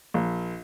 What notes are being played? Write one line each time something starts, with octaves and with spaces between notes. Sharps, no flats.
A#1